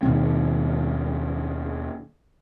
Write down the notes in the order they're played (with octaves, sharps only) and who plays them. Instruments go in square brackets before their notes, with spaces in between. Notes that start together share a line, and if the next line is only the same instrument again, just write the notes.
[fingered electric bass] D#2 B2 D#3 C4